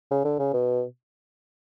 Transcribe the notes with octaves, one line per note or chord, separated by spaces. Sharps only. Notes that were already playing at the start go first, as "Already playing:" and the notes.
C#3
D3
C#3
B2